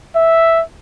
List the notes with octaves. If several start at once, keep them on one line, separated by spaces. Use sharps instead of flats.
E5